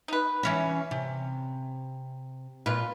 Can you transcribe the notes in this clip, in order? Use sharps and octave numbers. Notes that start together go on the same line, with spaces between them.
D#4 B4
E3 C#4 E5
C3
A#2 F4 B4